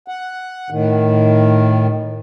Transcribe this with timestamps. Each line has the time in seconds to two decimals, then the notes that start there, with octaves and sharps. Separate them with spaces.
0.08 F#5
0.70 A2 D#3